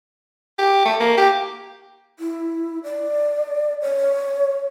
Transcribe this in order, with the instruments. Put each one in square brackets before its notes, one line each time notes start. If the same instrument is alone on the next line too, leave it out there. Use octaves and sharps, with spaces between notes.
[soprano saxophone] G4
A3
A#3
G4
[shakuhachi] E4
D5
C#5